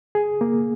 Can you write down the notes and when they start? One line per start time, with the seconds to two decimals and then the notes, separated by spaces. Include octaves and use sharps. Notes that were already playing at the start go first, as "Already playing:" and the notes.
0.15 G#4
0.41 A#3